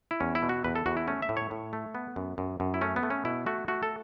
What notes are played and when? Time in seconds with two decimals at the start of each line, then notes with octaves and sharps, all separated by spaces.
0.11 E4
0.20 E2 C#4
0.35 E4
0.42 B2
0.49 F#4
0.64 E2 B4
0.76 A4
0.86 E2 F#4
0.97 E4
1.07 A3 C#4
1.22 E5
1.29 A2
1.37 C#5
1.51 A2
1.73 A3
1.95 B3
2.16 F#2
2.38 F#2
2.60 F#2
2.74 E4
2.81 A3 C#4
2.96 B3
3.03 A3
3.10 C#4
3.25 B2 E4
3.46 A3 F#4
3.68 A3 F#4
3.83 A4